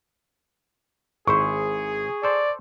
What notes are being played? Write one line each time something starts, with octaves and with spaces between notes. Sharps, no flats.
G#1 E4 G#4 C5 C#6
A4 C5 D5